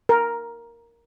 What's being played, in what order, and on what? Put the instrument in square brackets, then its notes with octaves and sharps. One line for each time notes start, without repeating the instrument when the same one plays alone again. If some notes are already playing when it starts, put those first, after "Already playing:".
[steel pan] A#4